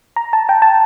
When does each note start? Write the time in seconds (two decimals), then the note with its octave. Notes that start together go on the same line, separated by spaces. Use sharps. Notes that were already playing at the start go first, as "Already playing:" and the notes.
0.16 A#5
0.33 A5
0.49 G5
0.62 A5